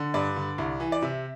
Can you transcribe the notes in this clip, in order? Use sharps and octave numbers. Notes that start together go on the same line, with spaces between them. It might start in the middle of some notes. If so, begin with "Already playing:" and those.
Already playing: D3
G2 D5
D3
C2
E3
D5
C3 E5